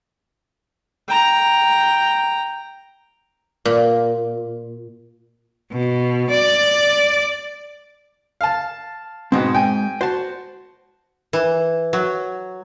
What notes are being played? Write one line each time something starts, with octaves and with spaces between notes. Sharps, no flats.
G5 A#5
A#2
B2
D5
F5 A5
G#2 B2 G#3 C4
G5 G#5
F#4 C5 A5
E3
F#3